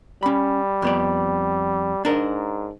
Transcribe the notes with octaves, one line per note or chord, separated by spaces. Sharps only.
G3 C#4 B5
F2 B3 D5
G#2 D4 A#4